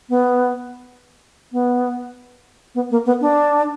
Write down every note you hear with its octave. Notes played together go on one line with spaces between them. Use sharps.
B3
B3
B3
A#3
B3
D4